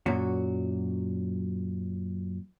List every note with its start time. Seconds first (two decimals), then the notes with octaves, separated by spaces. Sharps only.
0.06 F#2 A#2 F#3 F#4